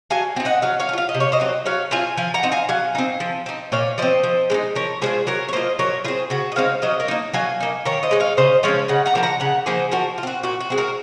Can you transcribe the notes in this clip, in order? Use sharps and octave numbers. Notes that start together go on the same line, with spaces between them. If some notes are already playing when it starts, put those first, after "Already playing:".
F#3 F5 G#5
C4 D#4
D#5 F#5
F#3 C#5 F5
C#5 F5
C#4
F4 F5
D#5
C3
C#5
C5 D#5
F#3 C4 D#4
F#3 C#5 F5
C4 F4 F5 G#5
F3 F5 G#5
F#5 A#5
C4 D#4
F5 G#5
F#3 F5 G#5
C4 D#4
F3
C4 D#4
A#2 C#5 F5
F3 C4 C5 D#5
F3
G#3 C4 D#4
F3 A#4 C#5
G#3 C#4 F4 G#4 C5
F#3 A#4 C#5
C#5
A#3 F4 C5 D#5
F#3 A#4 C#5
C4 F4 G#4 C5
C#3 F#4
D#5
G#3 C4 D#4 C#5 F5
F#3 C5 D#5
A#4 C#5
A#3 D#4
F#3 F5 G#5
A#3 D#4
D#3 A#4 C#5
C5 D#5
G#3 D#4
C#5 F5
C#3 C5 D#5
F3 G#3 C#4 C#5 F5
C#3 D#5 F#5
F#5 A#5
F3 A#3 D#4
F#5 A#5
C#3 F#5 A#5
F3 A#3 D#4 G#4 C5
F3 F#4 A#4
F4
C4 F#4
A#2 F#4
F#4
G#3 C4
F#4 A#4